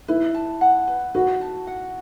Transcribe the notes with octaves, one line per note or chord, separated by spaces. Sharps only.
E4 B4
A5
F#5
B4
F#4 B4
A5
F#5